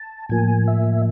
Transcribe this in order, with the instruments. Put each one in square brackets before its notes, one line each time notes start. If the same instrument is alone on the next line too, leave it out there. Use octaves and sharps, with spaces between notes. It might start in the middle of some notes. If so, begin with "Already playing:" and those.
Already playing: [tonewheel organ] A5
A2 F3 A#3 G#5
E5